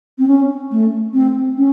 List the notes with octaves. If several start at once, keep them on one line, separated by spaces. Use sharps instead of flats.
C4
C#4
A3
C4
C#4